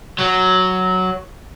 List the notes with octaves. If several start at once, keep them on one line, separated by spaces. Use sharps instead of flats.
F#3